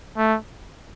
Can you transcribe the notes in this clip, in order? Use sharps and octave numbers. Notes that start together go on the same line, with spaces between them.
A3